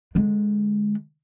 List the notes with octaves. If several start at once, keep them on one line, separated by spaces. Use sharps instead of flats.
D3 G#3